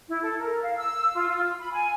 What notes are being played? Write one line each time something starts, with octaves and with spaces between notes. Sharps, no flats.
E4
A4
A#4
F5
E6
F4
F4
B5
G#5